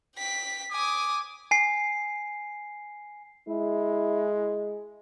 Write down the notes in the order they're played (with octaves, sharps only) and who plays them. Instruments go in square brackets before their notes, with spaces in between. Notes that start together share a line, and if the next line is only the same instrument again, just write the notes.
[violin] G5 B6
[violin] G#5 D#6 [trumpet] D6
[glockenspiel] G#5 C7
[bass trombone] G#3 [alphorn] E4